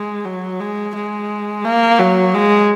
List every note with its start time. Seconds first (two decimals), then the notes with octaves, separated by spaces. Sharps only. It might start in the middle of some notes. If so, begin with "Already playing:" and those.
Already playing: G#3
0.25 F#3
0.60 G#3
0.95 G#3
1.64 A#3
1.99 F#3
2.34 G#3